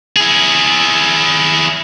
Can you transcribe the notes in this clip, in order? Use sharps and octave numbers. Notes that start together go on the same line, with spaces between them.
E4 G#4